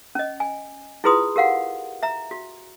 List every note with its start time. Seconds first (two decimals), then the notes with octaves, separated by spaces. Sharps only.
0.15 C#4 D#5
0.40 G#5
1.04 E4 F4 G#4 B4 C6 D#6
1.36 G4 A#4 F5 F#5
2.03 E5 A#5
2.31 F#4